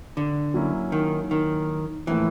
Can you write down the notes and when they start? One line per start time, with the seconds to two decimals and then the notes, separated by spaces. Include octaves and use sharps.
0.17 D3
0.54 F#3 A#3 C#4 E4
0.92 D#3
1.31 D#3
2.07 A2 E3 F3 A#3